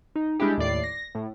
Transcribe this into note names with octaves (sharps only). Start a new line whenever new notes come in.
D#4
G3 G#3 D4 E4 G4
D#2 A2 D5 C7
A#6
A2